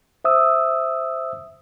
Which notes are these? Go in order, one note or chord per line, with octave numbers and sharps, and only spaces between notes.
C5 E5 D#6 E6